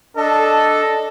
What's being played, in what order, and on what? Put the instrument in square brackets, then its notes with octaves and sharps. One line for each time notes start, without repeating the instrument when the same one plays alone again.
[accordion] D4 D#5 [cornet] A4